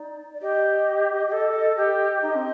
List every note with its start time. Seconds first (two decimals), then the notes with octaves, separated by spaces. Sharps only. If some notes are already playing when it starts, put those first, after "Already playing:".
Already playing: D#4 D5
0.33 D5
0.42 G4 D#5
1.28 G4
1.32 A4
1.77 G4
2.22 D#4 D#5
2.35 C4